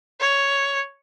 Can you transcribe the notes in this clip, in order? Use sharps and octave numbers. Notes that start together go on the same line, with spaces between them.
C#5